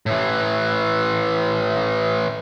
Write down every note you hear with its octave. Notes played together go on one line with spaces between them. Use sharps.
A2 E3